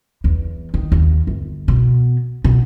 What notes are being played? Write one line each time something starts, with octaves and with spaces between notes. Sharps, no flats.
E2
D#3
D#2
G1
B2
B2